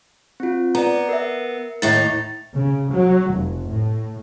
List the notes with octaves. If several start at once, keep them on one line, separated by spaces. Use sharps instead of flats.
C4 F4
B3 D5 A#5
A#4 E5
D#2 A2 D#4 A6
C#3
F#3
F1
A2